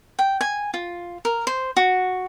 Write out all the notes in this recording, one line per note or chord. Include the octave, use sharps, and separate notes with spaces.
G5
G#5
F4
A#4
C5
F#4